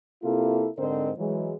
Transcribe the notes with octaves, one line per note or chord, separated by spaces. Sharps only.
C3 A#3 E4 F4 A4
G#2 D3 C4 A#4 C5 D#5
E3 F#3 G#3